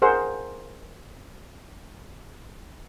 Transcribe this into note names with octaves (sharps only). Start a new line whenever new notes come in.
G#4 A#4 C5 F#5